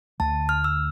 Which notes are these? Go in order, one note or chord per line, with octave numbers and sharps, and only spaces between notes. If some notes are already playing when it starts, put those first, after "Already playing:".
D2 D3 A3 A5
F6
E6